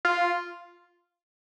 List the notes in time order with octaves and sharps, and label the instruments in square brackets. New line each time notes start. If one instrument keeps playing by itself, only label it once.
[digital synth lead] F4